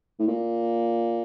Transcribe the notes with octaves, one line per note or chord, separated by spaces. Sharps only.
A2
A#2